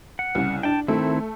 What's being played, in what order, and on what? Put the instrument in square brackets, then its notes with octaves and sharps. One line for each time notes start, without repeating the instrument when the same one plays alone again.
[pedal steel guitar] F#5
[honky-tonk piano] C2 C#3
[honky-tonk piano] D4 [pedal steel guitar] G5 A5
[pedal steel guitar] D#3 C4 E4 [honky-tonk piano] A3